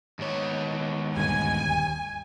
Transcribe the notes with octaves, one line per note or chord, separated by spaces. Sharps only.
D#2 G#2 B3 C#5
D#1 D2 G2 G#5